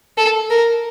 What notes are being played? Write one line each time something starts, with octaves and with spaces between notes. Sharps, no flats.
A4
A#4